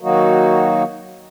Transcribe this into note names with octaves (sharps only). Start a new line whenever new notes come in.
D#3 F#3 A#3 D#4 F#4